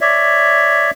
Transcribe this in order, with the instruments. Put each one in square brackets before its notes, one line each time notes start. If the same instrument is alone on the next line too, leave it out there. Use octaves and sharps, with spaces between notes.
[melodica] C#5 D5 E5